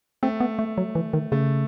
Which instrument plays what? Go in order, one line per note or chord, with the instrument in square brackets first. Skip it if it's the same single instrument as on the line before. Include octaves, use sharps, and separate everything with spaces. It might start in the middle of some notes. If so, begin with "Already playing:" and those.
[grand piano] A3 [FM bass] C4
[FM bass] B3
A3
F#3
E3
D#3
[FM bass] C#3 [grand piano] A3